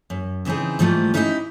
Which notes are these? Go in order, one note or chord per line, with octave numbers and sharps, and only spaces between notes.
F#2
C#3 E3 C4 D#4 G#4
G#2 E3 F3 G3 A3
C#4 D#4 E4 G4 C#5 D#5